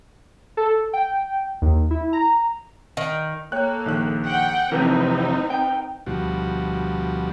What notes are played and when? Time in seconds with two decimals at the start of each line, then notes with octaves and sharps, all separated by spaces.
0.57 A4
0.93 G5
1.62 D#2
1.91 E4
2.13 A#5
2.97 D#3
3.52 A#3 A4 C#5 G5 F#6
3.86 A#1 D#3 F#6
4.26 F#5 G5
4.72 F2 C3 E3 C4 D#4 A#4 B4 G6
5.50 G5
6.06 D2 B2 F3 G3 F#4